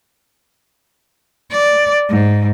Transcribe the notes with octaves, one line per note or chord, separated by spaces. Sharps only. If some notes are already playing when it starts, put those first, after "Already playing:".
D5
G#2